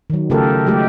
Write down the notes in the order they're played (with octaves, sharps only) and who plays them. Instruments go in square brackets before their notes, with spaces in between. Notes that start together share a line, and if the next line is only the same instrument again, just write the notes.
[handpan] D#3 F#3
C#3 A3 F4 G4 A4 A#4
F#3 G#3 A3 G4